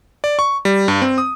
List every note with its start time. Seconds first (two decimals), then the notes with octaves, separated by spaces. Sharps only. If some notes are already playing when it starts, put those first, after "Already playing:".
0.24 D5
0.39 C#6
0.65 G3
0.88 G2
1.02 C4
1.18 D#6